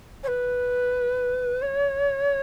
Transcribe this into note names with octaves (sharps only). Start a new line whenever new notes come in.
C#5
B4
C#5